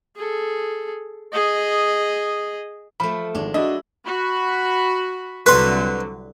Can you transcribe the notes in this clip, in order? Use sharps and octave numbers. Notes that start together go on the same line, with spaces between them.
G#4 A4
G#4 D#5
F3 A3 B5
G#1 G#3 D4
D4 E4 F#4 D#5
F#4 B5
C2 D3 F#3 B4 C6